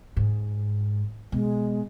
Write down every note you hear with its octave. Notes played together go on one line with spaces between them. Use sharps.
G#2
B2 G#3